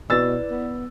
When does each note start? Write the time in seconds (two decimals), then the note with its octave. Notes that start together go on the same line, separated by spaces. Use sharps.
0.10 B2 E4 B4 D5 E6 A6
0.51 B3